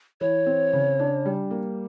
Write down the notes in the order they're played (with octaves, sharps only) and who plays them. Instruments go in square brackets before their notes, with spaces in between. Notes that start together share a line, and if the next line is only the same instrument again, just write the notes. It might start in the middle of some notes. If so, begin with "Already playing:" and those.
[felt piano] E3 [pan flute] C#5
[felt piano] C4
C#3
D4
G3
A#3